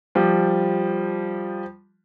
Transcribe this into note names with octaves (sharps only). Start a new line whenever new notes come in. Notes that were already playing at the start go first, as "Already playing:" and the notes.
F3 G3